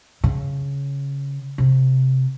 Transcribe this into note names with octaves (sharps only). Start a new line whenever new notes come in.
C#3
C3